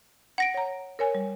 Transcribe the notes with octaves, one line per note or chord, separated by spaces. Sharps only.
F#5 A#6 D7
C#5 A#5
A#4 C#5 G#5
G3